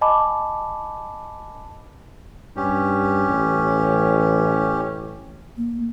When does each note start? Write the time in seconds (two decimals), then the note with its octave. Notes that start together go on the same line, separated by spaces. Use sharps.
0.01 D#5 G#5 A5 B5 D6
2.56 G2 C#4 G4
3.29 A1
5.57 A#3